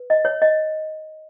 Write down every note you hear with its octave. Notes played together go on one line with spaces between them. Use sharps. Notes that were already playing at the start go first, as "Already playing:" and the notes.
Already playing: B4
D#5
C#5
D#5